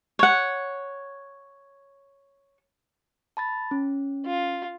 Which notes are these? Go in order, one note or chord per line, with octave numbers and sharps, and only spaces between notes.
C#5 F#5
A5 B5 A6
C#4
F4